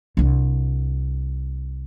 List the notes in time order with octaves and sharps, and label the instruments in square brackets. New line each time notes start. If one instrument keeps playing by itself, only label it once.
[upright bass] C2 D4